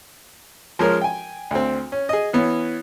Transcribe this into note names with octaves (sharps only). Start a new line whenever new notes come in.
F3 G#3 C#4 A#4
G5 G#5
D2 C4
C#4
G#4 D#5
E3 B3 C#4